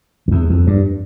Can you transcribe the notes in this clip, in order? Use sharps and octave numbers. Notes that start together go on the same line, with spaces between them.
F2
E2
F2
G2